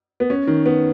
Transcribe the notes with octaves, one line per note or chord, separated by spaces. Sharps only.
B3
C#4
D#3
B3